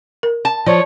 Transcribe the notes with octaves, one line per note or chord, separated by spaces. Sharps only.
A#4
A5
F3 C#5 D5